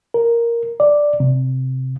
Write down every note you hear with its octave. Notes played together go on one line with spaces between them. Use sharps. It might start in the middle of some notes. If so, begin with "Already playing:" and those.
A#4
D5
C3